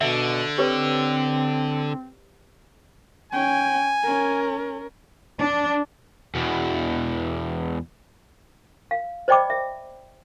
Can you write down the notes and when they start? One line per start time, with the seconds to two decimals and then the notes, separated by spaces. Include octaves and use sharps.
0.01 B2 D3 E5
0.58 C4 G4 B4 C#5
3.32 C#4 G5 G#5
4.03 C#4 A#4
5.41 D4
6.35 E2 B2
8.91 F5
9.28 C5 D5 D#5 G5 B5 D6
9.50 E5